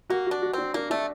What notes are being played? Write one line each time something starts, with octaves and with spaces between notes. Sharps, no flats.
A#3 F#4
D4 F#4
F#4
C4 D4
A#3 D4
A3 D4